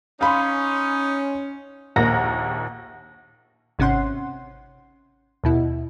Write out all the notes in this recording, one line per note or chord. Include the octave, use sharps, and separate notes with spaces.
C#4 D#4 F5 B5 C6
A#1 D#2 A#3 F#5 A#5 A#6
G#1 C3 C#4 F#5 C6
D#2 B2 E4